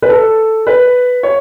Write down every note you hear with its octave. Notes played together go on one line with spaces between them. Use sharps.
B4
A4
B4
C#5